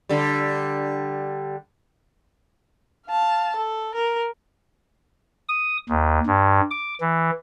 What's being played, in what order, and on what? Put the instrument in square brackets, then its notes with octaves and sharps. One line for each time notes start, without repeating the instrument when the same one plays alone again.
[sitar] D3 G3
[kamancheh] F5 A5
A4
A#4
[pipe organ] D#6
D#2
G2
D6
E3